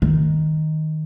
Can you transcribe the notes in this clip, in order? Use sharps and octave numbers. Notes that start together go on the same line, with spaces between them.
D#3